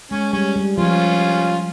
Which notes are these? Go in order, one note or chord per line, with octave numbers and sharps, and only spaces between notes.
G#3 C#4
G3 C#4
G3
F3 C#4 F4